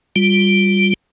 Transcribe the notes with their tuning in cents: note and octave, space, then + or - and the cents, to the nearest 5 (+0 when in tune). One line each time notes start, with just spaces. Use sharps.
G3 +0 F4 +30